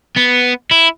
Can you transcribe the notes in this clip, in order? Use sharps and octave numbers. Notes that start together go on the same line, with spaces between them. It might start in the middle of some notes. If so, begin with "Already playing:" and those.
B3
E4